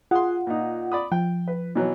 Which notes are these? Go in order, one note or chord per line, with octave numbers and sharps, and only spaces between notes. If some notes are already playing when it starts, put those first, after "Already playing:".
F4 G#4 F#5 C6
A#2 D#4
D5 B5 D#6
F3 G5
B4
B2 E3 F#3